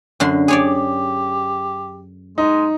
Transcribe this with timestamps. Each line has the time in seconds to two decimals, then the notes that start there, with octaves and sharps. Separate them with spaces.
0.20 F#2 D3 C6
0.48 G4 G#4 C#5 D5
2.38 G#3 D#4